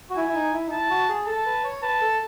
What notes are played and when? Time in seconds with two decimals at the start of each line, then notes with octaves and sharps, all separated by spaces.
0.10 F#4
0.16 E4 G#5
0.28 E4
0.34 D#4
0.53 E4
0.67 D#4
0.71 E4 A5
0.90 F#4
1.09 G#4
1.27 A4 A5
1.46 B4
1.64 C#5
1.82 B4 A5
2.01 A4